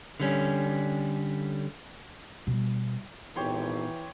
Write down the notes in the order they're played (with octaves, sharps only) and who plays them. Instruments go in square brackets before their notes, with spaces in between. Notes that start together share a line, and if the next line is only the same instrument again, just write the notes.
[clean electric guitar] D3 G3 C#4
[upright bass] B2 G3
[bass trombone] G#1 [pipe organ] A#2 B3 D#4 [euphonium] E3 [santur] G4 C#5 C6